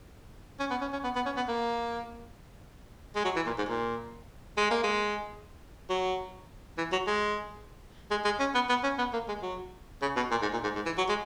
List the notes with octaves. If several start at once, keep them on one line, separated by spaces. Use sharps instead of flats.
C#4
B3
C#4
C#4
B3
B3
C#4
B3
A#3
G#3
F#3
E3
A#2
G#2
A#2
G#3
A#3
G#3
F#3
E3
F#3
G#3
G#3
G#3
C#4
B3
B3
C#4
B3
A#3
G#3
F#3
C#3
B2
A#2
G#2
A#2
G#2
G#2
E3
F#3
G#3